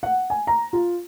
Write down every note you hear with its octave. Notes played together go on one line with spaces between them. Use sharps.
F#5
G#5
A#5
F4